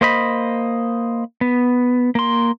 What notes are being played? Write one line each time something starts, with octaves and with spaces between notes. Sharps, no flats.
A#3 C5 D#5 B5
B3
A#3 C6